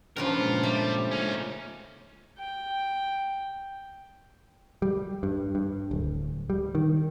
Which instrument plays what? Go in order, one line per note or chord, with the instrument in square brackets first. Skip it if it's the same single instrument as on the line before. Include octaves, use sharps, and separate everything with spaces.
[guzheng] G2 C#3 F3 [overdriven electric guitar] F4 A#4 [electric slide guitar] G5 A5
[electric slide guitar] A#2 G#3
[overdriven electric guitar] G3 [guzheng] A3
[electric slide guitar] G#3 A#3 F4 [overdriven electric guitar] C#4 D#4
[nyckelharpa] G5
[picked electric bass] G3
G2
G2
D1
G3
D#3